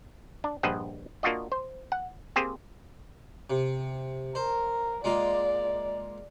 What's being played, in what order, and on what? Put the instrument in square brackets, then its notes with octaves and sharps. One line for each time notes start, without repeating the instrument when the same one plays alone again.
[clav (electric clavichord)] D4
A#1 G2 C5 D#5 F#5
A#3 D4 F4 F#4 D#5
C5
F#5
A#3 C4 G4 G#4 C5
[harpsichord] C3
[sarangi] A#4 [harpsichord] C5
[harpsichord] G#3 A#3 F4 [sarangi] D5